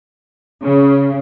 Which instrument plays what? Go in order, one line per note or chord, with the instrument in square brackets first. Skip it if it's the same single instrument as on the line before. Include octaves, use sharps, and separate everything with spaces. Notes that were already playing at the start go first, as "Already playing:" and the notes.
[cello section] C#3